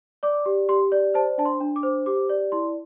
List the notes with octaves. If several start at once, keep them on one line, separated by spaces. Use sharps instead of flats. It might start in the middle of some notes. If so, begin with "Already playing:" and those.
D5 D6
G4
G4 C6
D5
C5 A5
D4 A5
C6
D4
D6
C5
G4 D6
D5
E4 C6